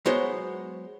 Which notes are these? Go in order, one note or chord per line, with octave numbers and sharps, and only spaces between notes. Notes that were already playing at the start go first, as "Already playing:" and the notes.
F#3 G#3 B3 F#4 C5 C#5